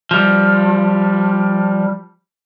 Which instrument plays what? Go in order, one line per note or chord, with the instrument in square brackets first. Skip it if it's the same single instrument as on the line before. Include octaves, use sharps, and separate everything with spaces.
[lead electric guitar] F3 G3